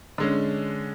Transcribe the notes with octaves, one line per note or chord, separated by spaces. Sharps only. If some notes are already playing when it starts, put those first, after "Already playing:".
D3 G#3 C#4